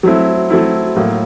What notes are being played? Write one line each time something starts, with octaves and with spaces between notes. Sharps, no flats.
F#3 A3 C4 E4
F#3 A3 C4 E4
A2 F#3 A#3